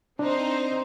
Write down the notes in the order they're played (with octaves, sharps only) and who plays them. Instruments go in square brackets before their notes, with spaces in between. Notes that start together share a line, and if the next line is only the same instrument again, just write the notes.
[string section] C4 D#4 C5 [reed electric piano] D4